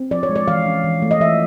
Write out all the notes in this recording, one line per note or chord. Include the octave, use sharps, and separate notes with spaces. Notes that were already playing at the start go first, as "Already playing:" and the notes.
Already playing: C4
F3 D5
C#5
G#3
D5
E3 F5
C#4
E3
A3
D#5
E3 E5